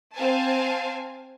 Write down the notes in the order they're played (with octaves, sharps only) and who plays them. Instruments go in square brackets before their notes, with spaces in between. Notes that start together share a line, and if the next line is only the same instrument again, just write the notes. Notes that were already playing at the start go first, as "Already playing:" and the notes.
[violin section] C4 F5 G#5 A5